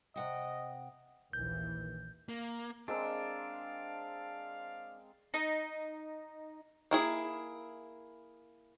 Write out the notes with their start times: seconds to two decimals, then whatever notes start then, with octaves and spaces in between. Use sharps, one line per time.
0.16 C3 D#5 F#5 G5
1.33 A#1 D#2 E3 G6
2.29 A#3
2.88 G#3 C4 D4 A#4 F5
5.34 D#4
6.91 A#3 E4 G#4